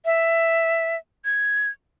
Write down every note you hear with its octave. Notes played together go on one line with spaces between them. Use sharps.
E5
G#6